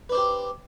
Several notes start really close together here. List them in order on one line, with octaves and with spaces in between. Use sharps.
B4 D4 C5 G4